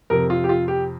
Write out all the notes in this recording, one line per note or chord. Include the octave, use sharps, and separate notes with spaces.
F2 C3 A#4
F4
G4
F4
G4